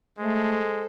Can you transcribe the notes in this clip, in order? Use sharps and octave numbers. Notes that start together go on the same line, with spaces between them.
G#3 A3 A4 C5